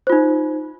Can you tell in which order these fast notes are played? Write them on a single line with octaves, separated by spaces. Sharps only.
C5 F4 D#4